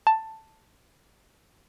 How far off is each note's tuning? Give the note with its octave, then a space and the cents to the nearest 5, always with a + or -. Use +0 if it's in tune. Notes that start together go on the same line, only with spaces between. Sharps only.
A5 +10